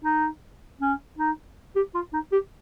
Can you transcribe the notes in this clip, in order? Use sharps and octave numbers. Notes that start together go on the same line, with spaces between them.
D#4
C#4
D#4
G4
F4
D#4
G4